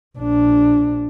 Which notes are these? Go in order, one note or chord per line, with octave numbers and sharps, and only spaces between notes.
A#1 D4